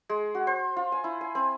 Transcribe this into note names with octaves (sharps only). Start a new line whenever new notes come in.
G#3
F#4
C5
F4
G#5
E4
G#5
C4